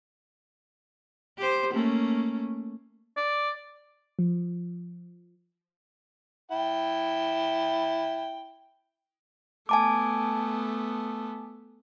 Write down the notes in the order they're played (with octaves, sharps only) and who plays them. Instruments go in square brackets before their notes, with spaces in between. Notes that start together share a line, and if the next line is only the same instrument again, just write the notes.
[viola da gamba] G4 C5
A3 A#3 C#4
[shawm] D5
[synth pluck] F3
[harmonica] E4 G5
[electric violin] A3 B3 [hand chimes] G#5 A5 D6